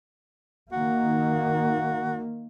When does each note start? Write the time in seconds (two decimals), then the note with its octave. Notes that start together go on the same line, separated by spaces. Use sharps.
0.72 D#3 A#3 F#4